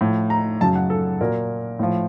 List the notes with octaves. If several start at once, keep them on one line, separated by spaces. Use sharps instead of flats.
A2 F3
A#5
F#2 C#3 F#3 A5
F#5
A4
A#2 F#3 A#4
A2 F3